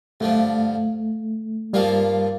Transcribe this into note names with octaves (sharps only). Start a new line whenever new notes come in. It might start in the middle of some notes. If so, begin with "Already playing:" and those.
G2 D3 F3 A3
G2 F3 G3 A#3 F4